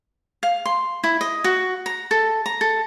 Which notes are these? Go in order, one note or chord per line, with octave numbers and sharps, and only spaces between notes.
F5
C6
E4
D#5
F#4
A#5
A4
A#5
A4